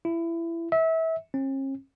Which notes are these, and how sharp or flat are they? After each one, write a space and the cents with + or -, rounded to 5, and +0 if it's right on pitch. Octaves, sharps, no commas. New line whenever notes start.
E4 +20
E5 -25
C#4 -45